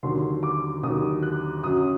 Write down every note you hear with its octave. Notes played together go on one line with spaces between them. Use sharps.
D#2 D3 F#3 C6
D6
D#2 D3 F#3 D#6
F#6
F#2 F#3 D#6